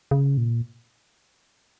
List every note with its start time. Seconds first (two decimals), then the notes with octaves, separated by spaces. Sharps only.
0.11 C#3
0.38 A#2